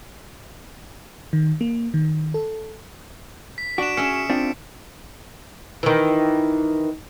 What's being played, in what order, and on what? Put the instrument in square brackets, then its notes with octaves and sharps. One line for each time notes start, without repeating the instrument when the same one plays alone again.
[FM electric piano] D#3
A#3
D#3
A4
[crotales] B6
[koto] D4 [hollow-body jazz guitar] F#4 [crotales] D7 E7
[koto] C#4 G#4 E5 [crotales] C#7
[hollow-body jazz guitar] C4 D4 F4
[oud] D#3 E3